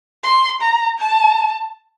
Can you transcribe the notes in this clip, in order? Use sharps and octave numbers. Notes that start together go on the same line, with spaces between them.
C6
A#5
A5